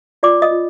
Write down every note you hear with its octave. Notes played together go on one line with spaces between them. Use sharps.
F4 D5 D6
D#5 D#6
F4